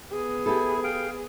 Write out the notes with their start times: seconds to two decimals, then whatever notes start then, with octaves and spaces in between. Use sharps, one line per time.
0.12 B3 G#4
0.46 E4 G4 A4
0.84 F5 G5